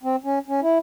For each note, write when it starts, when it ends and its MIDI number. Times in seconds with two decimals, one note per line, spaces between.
0.03 0.16 60
0.24 0.39 61
0.48 0.60 61
0.62 0.78 64